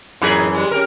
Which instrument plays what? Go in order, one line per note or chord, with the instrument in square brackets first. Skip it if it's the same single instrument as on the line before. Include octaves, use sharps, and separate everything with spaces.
[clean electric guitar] F#2 E3 [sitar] A2 D#4 G#4
[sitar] G3 G#3
C#4 G4 A#4